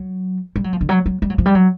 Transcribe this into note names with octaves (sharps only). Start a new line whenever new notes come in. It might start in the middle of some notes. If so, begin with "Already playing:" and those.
Already playing: F#3
G3
F#3
F3
D3
F#3
F#3
G3
F#3
F3
G3
F#3